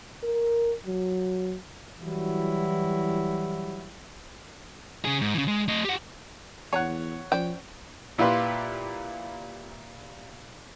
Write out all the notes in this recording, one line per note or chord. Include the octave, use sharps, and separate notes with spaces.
A#4
F#3
E3 F#3 G3 E4 F#4
C#3 G#4
G#2
C#3 E3
G#3
A3 D#5
G4 F#5
E2 C#5 F#5 G#5 A#5
F3 C#4 C5 D5 G5
A#2 E4 F4 G4 B4 C6